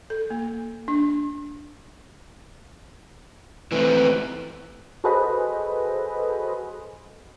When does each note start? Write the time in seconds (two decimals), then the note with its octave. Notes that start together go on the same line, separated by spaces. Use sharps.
0.10 A4
0.30 A#3
0.88 D4
3.72 E3 A3 C4 B4
5.04 F#4 G#4 A4 B4 C5 D#5